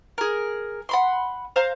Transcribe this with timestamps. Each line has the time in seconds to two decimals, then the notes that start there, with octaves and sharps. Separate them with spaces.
0.18 G#4 A#4
0.89 F#5 B5 C6
1.56 C5 F5 A#5